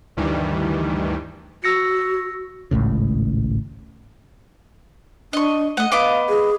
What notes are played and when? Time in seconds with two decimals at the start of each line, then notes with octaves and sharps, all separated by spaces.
0.17 D2 G2 D#3 E3 G3
1.64 F#4 E6 A#6 C#7
2.71 G#1 C#2 A2 C#3
5.33 D4 D#5 C#6
5.77 A3 D#5 F#5
5.92 B3 D#5 F5 D6
6.29 G#4